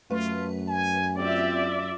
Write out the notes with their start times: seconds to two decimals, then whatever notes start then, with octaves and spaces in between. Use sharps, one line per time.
0.11 F#2 A3 F4 B4
0.68 G#5
1.18 C4 F4 G4 D5 E5